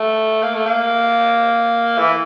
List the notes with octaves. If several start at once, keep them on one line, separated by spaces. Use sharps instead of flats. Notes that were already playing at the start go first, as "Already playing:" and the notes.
Already playing: A3
A#3
A3
A#3
E3